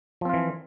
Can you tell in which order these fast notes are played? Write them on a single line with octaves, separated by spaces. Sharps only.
F3 C4 F4 E3